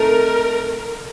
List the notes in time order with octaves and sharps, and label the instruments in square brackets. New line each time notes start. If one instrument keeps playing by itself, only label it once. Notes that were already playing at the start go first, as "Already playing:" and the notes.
Already playing: [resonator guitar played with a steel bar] C3 D#3 A3 D#4 A4 [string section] A#4